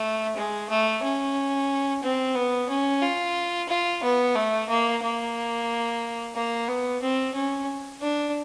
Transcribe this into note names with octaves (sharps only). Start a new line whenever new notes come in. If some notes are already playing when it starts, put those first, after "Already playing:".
Already playing: A3
G#3
A3
C#4
C4
B3
C#4
F4
F4
B3
A3
A#3
A#3
A#3
B3
C4
C#4
D4